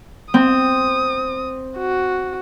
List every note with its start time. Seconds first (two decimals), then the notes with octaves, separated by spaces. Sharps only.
0.34 C4 D#6
1.78 F#4